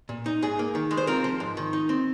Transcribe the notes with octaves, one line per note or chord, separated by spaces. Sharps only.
A#2
D#4
G#2 G#4
A#3
D#3
G#3
C5
C4 F4 A#4
F3
G#2
D#3
D#4
C4